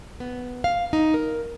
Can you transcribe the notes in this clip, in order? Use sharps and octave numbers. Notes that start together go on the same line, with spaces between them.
B3
F5
D#4
A#4